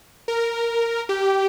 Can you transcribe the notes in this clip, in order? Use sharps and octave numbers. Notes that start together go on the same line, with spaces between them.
A#4
G4